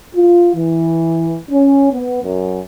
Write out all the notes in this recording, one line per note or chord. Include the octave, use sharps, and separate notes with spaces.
F4
E3
C#4
B3
F#2